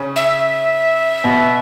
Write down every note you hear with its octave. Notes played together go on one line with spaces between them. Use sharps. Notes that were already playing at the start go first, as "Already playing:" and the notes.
Already playing: C#3 C#4
E5
B2 B3